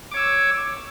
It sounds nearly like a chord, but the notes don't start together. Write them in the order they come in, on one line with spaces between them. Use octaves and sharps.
D6 C#5 E6